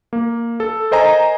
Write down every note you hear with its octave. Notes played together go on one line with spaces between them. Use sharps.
A#3
A4
A#4 C5 D#5 G#5 A#5